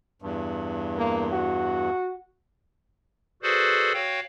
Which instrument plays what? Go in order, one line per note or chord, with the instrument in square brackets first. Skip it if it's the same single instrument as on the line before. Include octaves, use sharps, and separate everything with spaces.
[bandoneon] E2 G2
[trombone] A#3
F#4
[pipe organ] F#4 G#4 A4 B4 C5 D5
F#4 C#5 F5 G5